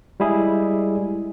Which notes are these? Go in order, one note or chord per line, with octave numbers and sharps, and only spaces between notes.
G3 G#3 E4 G#4